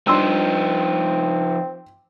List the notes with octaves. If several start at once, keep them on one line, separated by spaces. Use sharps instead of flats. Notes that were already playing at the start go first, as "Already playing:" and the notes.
F3 G3 C4 D4 D#4 C6 E6